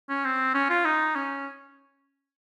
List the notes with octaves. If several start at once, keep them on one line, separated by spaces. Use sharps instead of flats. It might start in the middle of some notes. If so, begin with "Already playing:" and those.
C#4
C4
C#4
F4
D#4
C#4